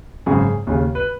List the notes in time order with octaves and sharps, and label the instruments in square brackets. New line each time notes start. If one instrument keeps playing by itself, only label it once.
[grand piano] G#1 F#2 C#3 G#4
D#2 C#3
B4